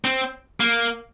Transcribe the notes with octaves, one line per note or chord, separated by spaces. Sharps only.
C4
A#3